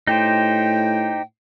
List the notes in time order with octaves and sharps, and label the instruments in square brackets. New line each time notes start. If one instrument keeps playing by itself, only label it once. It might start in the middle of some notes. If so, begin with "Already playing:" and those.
[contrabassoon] A2 [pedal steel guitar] D#4 G4 C5 [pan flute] G5